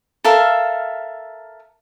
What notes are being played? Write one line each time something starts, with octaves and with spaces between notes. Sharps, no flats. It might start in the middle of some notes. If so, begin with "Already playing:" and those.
A4 A#4 E5 F5